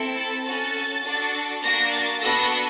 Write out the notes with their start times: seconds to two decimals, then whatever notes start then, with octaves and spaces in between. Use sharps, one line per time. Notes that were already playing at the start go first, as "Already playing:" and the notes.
Already playing: C4 E4 A4
0.16 A6
0.46 C#4 F#4 A4 A6
1.04 D4 F#4 A4
1.63 A#3 D4 F#4 A#6
1.92 A6
2.21 B3 D4 F#4 A4 A#6